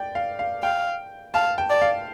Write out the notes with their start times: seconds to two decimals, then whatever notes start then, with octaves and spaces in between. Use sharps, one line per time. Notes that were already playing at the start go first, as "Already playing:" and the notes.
Already playing: D5 G5
0.15 F5
0.39 F5
0.63 F5 G5
1.34 F5 A5
1.58 G5
1.70 D5
1.81 F5